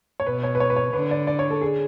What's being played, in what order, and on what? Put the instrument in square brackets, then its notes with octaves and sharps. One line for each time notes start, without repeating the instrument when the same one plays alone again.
[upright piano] C#5
[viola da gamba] B2 [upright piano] B4
[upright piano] C#5
B4
C#5
B4
C#5
[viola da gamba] D3 [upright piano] B4
[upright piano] D5
D5
C#5
A4
G#4